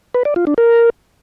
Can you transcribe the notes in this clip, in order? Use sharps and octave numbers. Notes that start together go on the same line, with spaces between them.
B4
D5
F4
D4
A#4